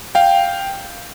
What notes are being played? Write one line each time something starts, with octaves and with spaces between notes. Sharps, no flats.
F5 G5